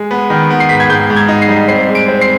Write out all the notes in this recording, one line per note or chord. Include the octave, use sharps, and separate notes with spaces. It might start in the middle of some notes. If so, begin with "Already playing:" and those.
Already playing: G#3
B3
D#3
B3
C7
G#2 B6
G#6
G#2 G6
G#2
G#6
D#4
C7
G3
C4 C7
G#3
D7
C4
C7